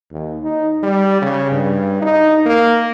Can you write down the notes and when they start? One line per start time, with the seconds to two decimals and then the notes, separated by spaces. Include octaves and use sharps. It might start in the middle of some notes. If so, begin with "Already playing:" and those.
0.12 D#2
0.43 D#4
0.83 G3
1.22 C#3
1.52 G2
2.02 D#4
2.46 A#3